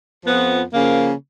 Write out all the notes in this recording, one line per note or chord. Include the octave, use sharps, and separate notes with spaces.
F2 F3 B3
C#3 F3 A#3